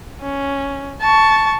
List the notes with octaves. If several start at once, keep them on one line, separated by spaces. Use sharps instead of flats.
C#4
A5 C#6